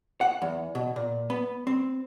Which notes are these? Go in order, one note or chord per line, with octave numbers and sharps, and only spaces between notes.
F#5
E2
B2
A#2
B3
C4